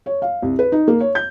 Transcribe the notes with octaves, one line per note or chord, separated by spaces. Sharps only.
C#5
F5
C2
B4
D#4
A#3
C#5
G6